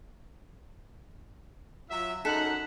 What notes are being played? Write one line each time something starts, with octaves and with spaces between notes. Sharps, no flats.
F#3 F4 E5
F#2 D#4 A4 F#5 B6 F#7